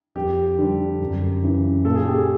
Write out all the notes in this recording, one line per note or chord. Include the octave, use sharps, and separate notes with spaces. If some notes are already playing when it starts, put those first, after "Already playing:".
F2 G4
D3 G3
F#2
C#3 E3
A#2 A4
G#4
G4
G#4